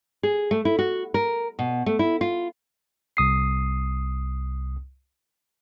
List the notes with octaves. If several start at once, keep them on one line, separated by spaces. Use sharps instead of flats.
G#4
A3
E4
F#4
A#4
B2
A3
E4
F4
C2 D#6 C7